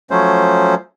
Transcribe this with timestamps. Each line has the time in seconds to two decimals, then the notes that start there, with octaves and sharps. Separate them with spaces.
0.11 F3 F#3 A3 C#4 C5